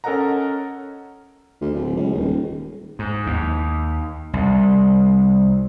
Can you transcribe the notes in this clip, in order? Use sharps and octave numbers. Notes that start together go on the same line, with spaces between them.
C#4 A4 A#4 D#5 F#5 A#5
D2
D1
C#2
D#1
G#2
D#2
C2